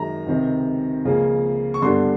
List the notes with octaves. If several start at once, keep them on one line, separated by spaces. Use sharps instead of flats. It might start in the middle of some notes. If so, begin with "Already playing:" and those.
Already playing: F#2 D#3 G#3 A#5
C#2 C3 D#3
C#2 C#3 F3 A#3
C#6
G2 D3 G3 B3 D4 C6